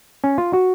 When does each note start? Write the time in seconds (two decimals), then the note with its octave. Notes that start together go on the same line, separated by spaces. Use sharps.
0.24 C#4
0.38 F4
0.53 F#4